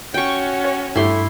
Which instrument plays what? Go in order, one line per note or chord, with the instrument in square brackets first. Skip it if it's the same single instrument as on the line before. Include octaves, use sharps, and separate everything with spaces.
[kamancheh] C#4 F#4 [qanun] G5 C#6
[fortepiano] C#5
[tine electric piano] G2 [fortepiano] A3 G4 [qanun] E4 C6